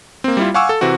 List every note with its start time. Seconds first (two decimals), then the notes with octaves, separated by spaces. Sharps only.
0.24 A#3 C4
0.37 G3 E4 F4
0.54 F5 F#5 G#5 C#6 D6 E6
0.69 A4
0.81 C3 E3 C4 F#4